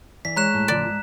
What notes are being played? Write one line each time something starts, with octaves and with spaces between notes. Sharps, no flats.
E3 D5 B6
G#3 C#5 A#5 F#6 E7
A2
C#3 E3 F3 D5
G#2